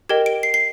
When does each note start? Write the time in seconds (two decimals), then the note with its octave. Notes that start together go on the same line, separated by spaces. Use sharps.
0.09 G4 A#4 D#5 G5 G#6
0.26 D7
0.43 C7
0.54 C7